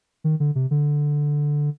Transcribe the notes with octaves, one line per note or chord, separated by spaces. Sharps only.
D#3
D3
C3
D3